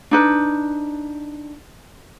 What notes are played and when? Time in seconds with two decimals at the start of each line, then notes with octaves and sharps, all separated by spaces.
0.11 D4 D#4 B4